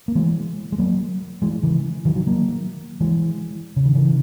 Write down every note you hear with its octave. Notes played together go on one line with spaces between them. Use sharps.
A#3
E3 G#3
G#3
F#3 A#3
E3 G#3
C#3 E3
D#3 F#3
D#3 F#3
F#3 A#3
E3 G#3
C#3
D#3
C#3 E3